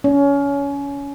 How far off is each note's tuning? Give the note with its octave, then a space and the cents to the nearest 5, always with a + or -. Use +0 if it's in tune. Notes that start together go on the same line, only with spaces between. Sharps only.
C#4 +25